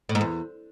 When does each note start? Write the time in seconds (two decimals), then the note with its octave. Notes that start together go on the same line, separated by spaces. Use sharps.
0.09 A2
0.15 G#2
0.21 E2